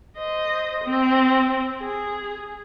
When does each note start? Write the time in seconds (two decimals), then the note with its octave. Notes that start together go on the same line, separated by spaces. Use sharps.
0.18 C5 D#5
0.84 C4
1.80 G#4